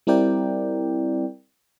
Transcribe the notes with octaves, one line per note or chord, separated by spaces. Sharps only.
G3 C4 E4 A#4 D5 G5